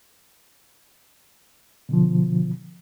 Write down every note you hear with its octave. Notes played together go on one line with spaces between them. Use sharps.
B2 D3 F3